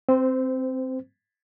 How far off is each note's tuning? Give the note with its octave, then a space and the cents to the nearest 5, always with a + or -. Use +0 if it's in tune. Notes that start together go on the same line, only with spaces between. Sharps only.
C4 +0 C5 -25